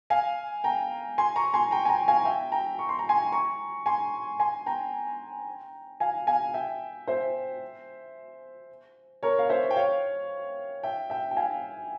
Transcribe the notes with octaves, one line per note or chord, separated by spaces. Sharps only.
F5 G#5
G5 A#5
G#5 C6
A#5 C#6
G#5 C6
G5 A#5
G#5
G5 A#5
F5 G#5
E5 G5
G5 A#5
C#6
C6
A#5
G#5 C6
A#5 C#6
G#5 C6
G#5 C6
G5 A#5
F5 G#5
F5 G#5
E5 G5
C5 E5
A#4 C#5
F5
C5 E5
G5
C#5 F5
E5 G5
E5 G5
G5
F5 G#5